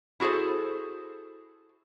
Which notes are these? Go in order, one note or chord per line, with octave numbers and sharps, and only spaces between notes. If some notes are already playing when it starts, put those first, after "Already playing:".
E4 F#4 G#4 A4 C5